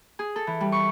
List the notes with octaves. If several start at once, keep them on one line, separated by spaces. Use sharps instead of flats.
G#4
A4
E3
G3
C#6